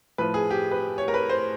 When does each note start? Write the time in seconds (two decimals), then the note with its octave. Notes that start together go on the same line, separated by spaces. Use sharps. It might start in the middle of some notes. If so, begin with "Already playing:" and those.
0.18 A2 F3 B4
0.34 G#4
0.50 G4
0.71 B4
0.98 C#5
1.08 A#4
1.14 B4
1.29 C5